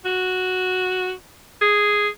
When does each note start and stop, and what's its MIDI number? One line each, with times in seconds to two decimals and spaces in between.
0.05 1.13 66
1.62 2.08 68